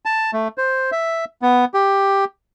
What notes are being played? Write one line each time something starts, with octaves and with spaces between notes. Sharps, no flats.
A5
A3
C5
E5
B3
G4